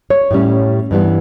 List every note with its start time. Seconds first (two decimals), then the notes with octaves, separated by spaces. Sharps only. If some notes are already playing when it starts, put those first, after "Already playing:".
0.10 C#5
0.31 A2 G3 C#4
0.91 G2 E3 G3 B3